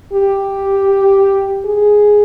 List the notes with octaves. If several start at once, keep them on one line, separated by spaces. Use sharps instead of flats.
G4
G#4